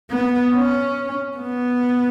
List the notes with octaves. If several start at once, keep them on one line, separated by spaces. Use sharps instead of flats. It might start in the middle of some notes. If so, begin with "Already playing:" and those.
B3
C#4
B3